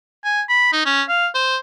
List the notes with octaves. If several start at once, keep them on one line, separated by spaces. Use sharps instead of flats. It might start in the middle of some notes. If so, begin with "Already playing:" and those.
G#5
B5
D#4
C#4
F5
C5